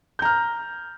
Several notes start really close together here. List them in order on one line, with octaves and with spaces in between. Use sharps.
G6 A#5 F6